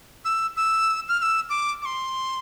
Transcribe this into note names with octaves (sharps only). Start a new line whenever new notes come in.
E6
E6
F6
F6
E6
D6
D6
C6